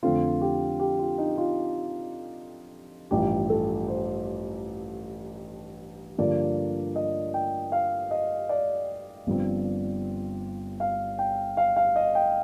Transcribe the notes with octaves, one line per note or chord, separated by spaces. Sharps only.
F2 D3 A3 C4 F4
G4
G4
F4
D#4
F4
A1 G2 F3 G4
A4
C5
G2 D3 F3 A#3 D5
D#5
G5
F5
D#5
D5
G1 G2 F3 C4
F5
G5
F5
F5
D#5
G5